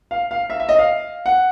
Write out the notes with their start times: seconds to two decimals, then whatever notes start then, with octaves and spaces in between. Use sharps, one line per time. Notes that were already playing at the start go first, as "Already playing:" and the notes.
0.11 F5
0.31 F5
0.50 E5
0.60 E5
0.69 D#5
0.79 F5
1.26 F#5